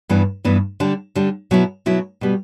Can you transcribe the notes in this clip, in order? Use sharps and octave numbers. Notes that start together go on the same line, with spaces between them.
G2 E3 B3 D4
G2 E3 B3 D4
D3 G3 D4
D3 G3 D4
B2 F#3 B3 E4
B2 F#3 B3 E4
B2 G3 B3